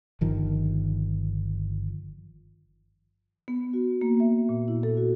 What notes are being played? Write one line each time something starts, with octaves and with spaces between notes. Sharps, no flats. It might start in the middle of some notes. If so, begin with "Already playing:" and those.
G1 D#3 F3
B3
F#4
A#3
E5
A#2
E4
A4
F#4